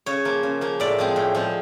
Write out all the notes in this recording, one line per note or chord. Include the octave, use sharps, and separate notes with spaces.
C#3 C#5
F3 A#3
C#3
F3 A#3
A2 D5
F3 G#3 C4
A2
F3 G#3 C4